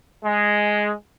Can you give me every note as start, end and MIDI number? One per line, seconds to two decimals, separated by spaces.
0.24 0.93 56